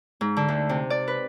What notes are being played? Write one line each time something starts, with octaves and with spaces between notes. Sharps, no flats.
G#2
D3
D2
C3
D5
B4